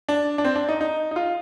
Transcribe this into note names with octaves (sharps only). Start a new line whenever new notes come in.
D4
D4
C4
D4
D#4
D#4
D#4
F4